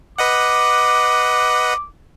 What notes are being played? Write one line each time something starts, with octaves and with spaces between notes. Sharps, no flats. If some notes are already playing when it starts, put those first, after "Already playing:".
B4 D#5 F#5 D6